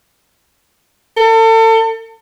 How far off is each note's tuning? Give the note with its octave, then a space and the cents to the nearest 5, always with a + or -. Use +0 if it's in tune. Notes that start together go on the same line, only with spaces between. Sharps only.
A4 +35